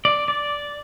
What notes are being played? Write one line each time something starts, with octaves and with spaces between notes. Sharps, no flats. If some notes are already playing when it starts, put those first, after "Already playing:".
D5
D5